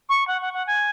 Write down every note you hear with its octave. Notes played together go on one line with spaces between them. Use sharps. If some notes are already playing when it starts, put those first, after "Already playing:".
C#6
F#5
F#5
F#5
G#5